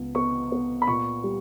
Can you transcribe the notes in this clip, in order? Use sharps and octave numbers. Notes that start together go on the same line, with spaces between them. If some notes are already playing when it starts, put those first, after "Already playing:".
Already playing: C#2 B3
B3 C#6
B3
B5
A#2 C#6
G3